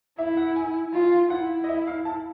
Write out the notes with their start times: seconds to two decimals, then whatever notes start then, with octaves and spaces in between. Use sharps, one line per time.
0.18 E4 E5
0.37 F#5
0.56 G#5
0.93 F4
1.30 E4 F#5
1.64 D#5
1.69 E5
1.87 F5
2.05 A5